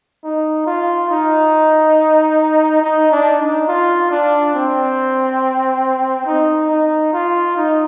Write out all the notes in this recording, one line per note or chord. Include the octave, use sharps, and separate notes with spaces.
D#4
F4
D#4
D#4
D4
D#4
F4
D4
C4
D#4
D#4
F4
D#4